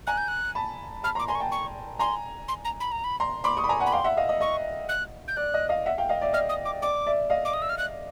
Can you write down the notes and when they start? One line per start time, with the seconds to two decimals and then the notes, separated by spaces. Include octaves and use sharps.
0.07 G#5 A#5 F#6
0.18 G6
0.28 F#6
0.55 A5 B5
1.03 A5 B5 F6
1.15 A#5 C6
1.19 D6
1.28 G#5 A#5 C6
1.35 C#6
1.40 G5 A5
1.52 C#6
1.99 G#5 A#5 C6
2.48 C6
2.65 A#5
2.80 B5
2.92 A#5
3.04 B5
3.20 A#5 C6
3.44 B5 C6 D6
3.57 C#6 D#6
3.64 B5
3.69 G#5 A#5
3.80 F#5 G#5
3.86 B5
3.92 F5 G5 C6
4.04 E5 F#5
4.17 D#5 F5
4.29 D#5
4.41 D#5 C#6
4.89 F#6
5.28 G6
5.37 D5 F#6
5.54 D#5
5.69 D#5 F5
5.86 E5 F#5
5.98 F5 G5
6.09 D#5 F5
6.21 D5 E5
6.33 D#5 F6
6.49 D#6
6.65 D6
6.82 D5 D6
7.06 D5 E5
7.30 D#5 F5
7.45 D6
7.54 D#6
7.62 E6
7.69 F6
7.78 F#6